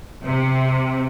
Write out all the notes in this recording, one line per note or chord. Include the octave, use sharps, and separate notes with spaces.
C3